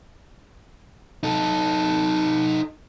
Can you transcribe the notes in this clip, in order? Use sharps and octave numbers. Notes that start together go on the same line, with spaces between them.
D#4 A4